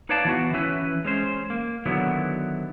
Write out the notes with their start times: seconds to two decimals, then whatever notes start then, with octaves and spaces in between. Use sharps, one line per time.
0.09 D#4 B4 C#5 D5 F5 A5
0.25 E3 B3 F#4
0.53 E3 C#4 E4 B4
1.05 G#3 C#4 C5
1.50 A#3
1.86 D3 D#3 F#3 B3 E4